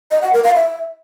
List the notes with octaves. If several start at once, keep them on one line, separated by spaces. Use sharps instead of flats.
D#5
F#5
A#4
F5
E5